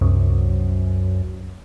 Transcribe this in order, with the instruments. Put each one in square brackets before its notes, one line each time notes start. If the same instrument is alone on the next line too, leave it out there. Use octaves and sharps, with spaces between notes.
[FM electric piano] C2 [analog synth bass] F#2